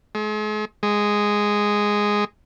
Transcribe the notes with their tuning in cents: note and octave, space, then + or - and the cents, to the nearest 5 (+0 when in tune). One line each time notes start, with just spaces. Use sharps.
G#3 +40
G#3 -5